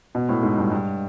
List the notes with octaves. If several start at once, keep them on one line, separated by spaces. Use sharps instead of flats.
B2
A2
G#2
G2
G2